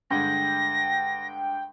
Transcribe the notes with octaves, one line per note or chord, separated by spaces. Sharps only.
G2 D3 G#3 G5 A#6